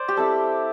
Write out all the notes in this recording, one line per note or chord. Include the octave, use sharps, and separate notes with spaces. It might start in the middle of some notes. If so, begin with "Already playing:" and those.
Already playing: C5 D5
G4
G3 C4 E4 A4